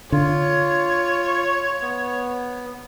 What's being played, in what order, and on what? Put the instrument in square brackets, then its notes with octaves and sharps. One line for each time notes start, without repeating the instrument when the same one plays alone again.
[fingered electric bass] D3 [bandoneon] F4 [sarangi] C#5
[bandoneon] B3